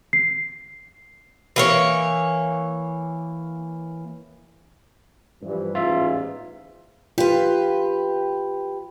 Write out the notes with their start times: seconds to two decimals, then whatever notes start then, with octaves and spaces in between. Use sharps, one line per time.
0.13 C7
1.56 E3 A#3 C#5
5.42 G2 E3 F3
5.75 A1 E2 G#2 F4 E5
7.18 F4 G4 B4